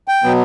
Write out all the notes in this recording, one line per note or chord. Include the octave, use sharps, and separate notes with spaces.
G5
B2 F#3 B3